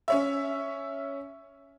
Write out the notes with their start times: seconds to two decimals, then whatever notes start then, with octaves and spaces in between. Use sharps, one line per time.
0.08 C#4 C#5 E5